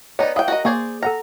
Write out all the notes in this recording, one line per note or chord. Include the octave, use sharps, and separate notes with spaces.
B3 D#4 C#5 D5
E3 E5 F5 G5 D#6
F#4 A#4 D#5
A#3 G#4 C5 D5 C#6 G#6
A4 F#5 A#5 F6